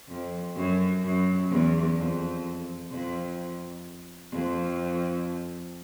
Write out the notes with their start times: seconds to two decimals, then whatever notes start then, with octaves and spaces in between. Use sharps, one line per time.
0.09 F2
0.56 F#2
1.03 F#2
1.50 E2
1.96 F2
2.90 F2
4.31 F2